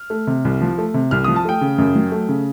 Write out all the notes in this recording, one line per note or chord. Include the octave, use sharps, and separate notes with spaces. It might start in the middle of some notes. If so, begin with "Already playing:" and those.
Already playing: F6
A3
C3
C2
F3
A3
C3
C2 F6
F3 D#6
A5
A3 G5
C#3
F#2
F#3
A3
C#3